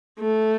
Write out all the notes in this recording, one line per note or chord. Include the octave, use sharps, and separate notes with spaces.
A3